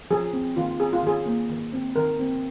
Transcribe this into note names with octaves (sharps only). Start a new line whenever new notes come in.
F3 G#4
C4
D#3 F4
C4 G#4
F4
D#3 G#4
A#3
D#3
C4
D#3 A#4
C4